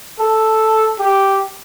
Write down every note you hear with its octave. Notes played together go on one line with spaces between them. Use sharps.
A4
G4